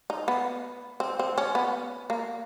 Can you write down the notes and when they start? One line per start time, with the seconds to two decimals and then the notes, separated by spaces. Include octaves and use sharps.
0.10 D#4
0.28 B3
1.00 C4
1.19 C4
1.38 C#4
1.55 B3
2.10 A#3